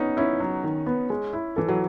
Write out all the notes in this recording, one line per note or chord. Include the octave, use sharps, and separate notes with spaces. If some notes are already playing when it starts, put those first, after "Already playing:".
Already playing: B3 C#4 D#4
C#4 E4
F#3
D#3
B3
G#3
E4
E3 A4
F#3